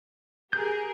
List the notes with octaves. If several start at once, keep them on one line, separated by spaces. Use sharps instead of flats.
G4 G#4 A#4 G6